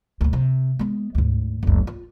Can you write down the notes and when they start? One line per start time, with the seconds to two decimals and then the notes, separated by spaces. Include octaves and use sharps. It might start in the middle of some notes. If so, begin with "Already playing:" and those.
0.21 D2 A#2
0.33 C3
0.79 G#3 B3
1.15 D2 G#2
1.63 F#1 D2
1.87 F4